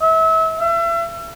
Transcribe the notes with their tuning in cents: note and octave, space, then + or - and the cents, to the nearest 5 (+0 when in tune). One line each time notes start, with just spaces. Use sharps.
E5 -30
E5 +35